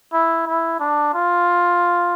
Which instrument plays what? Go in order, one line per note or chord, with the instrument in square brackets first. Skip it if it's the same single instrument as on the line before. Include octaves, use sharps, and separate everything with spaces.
[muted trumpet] E4
E4
D4
F4